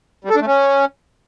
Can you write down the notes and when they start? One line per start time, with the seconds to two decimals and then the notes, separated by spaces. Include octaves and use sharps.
0.25 G3
0.30 A4
0.36 D4
0.41 A3
0.47 C#4